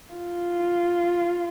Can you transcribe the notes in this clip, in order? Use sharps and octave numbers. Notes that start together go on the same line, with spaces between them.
F4